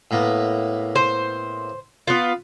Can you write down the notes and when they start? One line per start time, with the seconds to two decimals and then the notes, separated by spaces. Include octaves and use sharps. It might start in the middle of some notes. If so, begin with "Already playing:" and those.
0.11 A2 A#3 B3
0.96 C5
2.07 B3 F4 B4